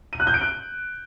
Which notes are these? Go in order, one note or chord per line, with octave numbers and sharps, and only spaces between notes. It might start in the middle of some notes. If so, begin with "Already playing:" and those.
D#7
F#6
G6
D7
F#6